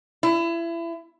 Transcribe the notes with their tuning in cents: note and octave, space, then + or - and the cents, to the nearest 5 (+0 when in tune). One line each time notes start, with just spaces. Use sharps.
E4 +30